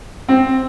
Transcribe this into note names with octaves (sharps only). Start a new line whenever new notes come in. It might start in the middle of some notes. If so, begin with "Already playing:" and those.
C4